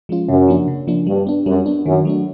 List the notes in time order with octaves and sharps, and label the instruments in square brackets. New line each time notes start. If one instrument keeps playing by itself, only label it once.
[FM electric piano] F3 G#3 C#4 F4
[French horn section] F#2 [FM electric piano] C#3
[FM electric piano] F3 A#3 D4
C#3
F3 A#3 D4
[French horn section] G2 [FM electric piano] G3
[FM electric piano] B3 D4
[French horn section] F#2 [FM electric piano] G3
[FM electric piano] B3 D4
[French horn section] F#2 [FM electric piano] D#3
[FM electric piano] F#3 A3 D4